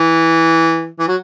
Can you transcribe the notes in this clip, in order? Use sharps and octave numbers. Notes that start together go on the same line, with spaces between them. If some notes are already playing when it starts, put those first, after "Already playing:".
Already playing: E3
E3
F#3